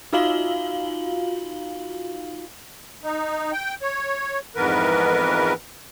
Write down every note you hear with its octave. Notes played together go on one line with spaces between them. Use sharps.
D#4 F4 F#4 F5 F#7 G7
D#4
G5
C#5
F2 G#2 E3 B3 A#4 B4